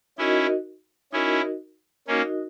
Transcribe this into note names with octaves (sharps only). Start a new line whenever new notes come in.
C#4 D#4 E4 F#4 A#4 D#5
C#4 D#4 E4 F#4 A#4 D#5
A#3 C#4 D#4 F#4 A#4 D#5